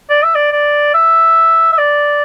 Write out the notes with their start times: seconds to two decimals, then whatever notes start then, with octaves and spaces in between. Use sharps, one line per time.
0.10 D5
0.23 E5
0.35 D5
0.52 D5
0.94 E5
1.72 E5
1.78 D5